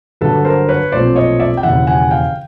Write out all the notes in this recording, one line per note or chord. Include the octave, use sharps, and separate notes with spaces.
G1 G2 D3 F#3 A4 B4
A#4 C5
B4 C#5
B1 A#2 F3 A3 C4 C5 D5
C#5 D#5
D5 E5
G5
E1 D#2 C#3 E3 E5 F#5
F#5 G#5
F5 G5